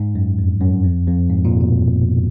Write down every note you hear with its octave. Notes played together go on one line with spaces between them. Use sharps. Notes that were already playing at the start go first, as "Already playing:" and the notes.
Already playing: G#2
F#2
F2
F#2
F2
F2
G#2
A#2
B2